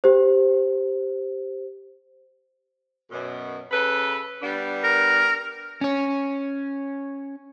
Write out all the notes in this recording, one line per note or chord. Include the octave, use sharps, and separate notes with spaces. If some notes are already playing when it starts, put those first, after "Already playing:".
G4 C5
F#2 B2
C#3 A4 B4
G3 B3 D4
A#4
C#4 C#5